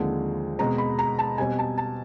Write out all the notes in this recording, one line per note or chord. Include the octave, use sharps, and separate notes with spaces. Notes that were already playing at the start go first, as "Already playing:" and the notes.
Already playing: D#2 D3 F3 G#3 C4
B2 G#3 C4 A#5
B5
A#5
A5
B2 G3 C4 G#5
A5
A5